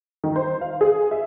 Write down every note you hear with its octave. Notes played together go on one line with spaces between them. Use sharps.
D#3
C5
F5
G#4
E5